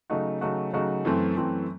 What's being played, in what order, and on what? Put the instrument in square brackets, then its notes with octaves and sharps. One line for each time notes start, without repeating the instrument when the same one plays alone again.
[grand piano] C#3 F#3 A3 D#4 F#4
C#3 F#3 A3 D#4 F#4
C#3 F#3 A3 D#4 F#4
F#2 E3 A3 C4
F#2 E3 A3 C4